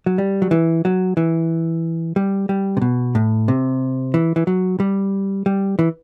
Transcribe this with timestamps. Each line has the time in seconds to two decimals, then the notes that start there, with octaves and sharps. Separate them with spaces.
0.06 F#3
0.18 G3
0.42 F#3
0.51 E3
0.85 F#3
1.17 E3
2.16 G3
2.49 G3
2.77 C3
2.82 B2
3.15 A2
3.48 C3
4.14 E3
4.36 E3
4.47 F#3
4.80 G3
5.46 G3
5.79 E3